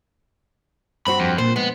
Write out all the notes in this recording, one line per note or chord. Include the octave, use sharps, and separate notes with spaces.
G2 C4 F#4 B5
F2
A#2 C5
G#3 B3